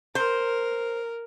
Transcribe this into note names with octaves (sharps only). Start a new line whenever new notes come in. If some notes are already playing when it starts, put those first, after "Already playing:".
A#4 C5